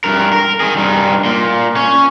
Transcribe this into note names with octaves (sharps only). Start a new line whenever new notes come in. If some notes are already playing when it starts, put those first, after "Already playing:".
G2 A#4
A#4
D#3 G#4
G2 D#4
A#2
C#4